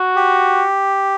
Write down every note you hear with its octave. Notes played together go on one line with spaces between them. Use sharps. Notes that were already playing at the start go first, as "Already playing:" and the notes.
Already playing: F#4
G4